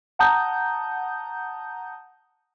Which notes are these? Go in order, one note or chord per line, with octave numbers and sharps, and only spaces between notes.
F#5 A5 A#5 D#6 G6